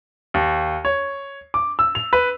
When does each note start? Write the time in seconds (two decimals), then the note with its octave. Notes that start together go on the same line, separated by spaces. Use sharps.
0.34 D#2
0.85 C#5
1.54 D6
1.79 E6
1.95 F7
2.13 B4